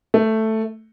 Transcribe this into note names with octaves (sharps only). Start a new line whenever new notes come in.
A3